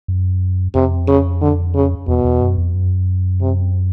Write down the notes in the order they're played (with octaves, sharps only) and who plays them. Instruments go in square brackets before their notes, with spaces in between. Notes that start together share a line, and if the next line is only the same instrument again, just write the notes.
[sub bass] F#2
[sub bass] F2 [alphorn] C3
[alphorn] C#3
D3
C#3
[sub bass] E2 [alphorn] B2
[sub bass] E2
F#2
F2
F#2
[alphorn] C3